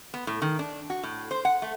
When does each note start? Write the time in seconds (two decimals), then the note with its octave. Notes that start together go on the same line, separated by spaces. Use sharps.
0.14 B3
0.27 A2
0.42 D#3
0.59 D4
0.90 F#4
1.03 A2
1.31 C5
1.45 F#5
1.62 A3